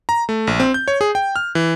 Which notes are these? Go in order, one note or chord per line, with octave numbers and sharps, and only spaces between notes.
A#5
A3
A#1
C4
G6
C#5
G#4
G5
F6
E3